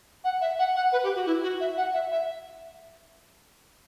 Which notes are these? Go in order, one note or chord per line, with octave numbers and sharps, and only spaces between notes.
F#5
E5
F#5
F#5
B4
G4
F#4
E4
F#4
E5
F#5
E5
E5